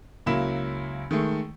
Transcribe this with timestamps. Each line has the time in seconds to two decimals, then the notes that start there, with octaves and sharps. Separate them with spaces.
0.26 C#2 F#3 A#3 E4 B5 E7
1.11 D#3 G#3 A3